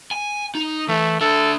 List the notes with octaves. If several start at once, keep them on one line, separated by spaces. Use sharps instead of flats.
G#5
D#4
E3 A3
D4 A4 E5